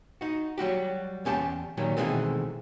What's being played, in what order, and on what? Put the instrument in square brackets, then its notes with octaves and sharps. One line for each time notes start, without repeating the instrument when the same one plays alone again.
[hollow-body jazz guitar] D#4 F#4
F#3 G3 F#4 G4
E2 C#4 G4 G#5 A5
A#2 D#3 F#3 G3
B2 D#3 E3 G#3 A3 C4